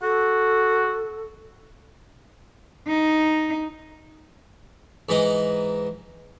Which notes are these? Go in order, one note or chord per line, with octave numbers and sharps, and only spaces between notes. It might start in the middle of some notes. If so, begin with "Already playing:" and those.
F#4 A4
D#4
G#2 E3 D#4 D#5 D6